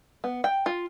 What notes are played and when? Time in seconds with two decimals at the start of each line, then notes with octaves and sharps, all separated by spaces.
0.24 B3
0.44 G5
0.66 F4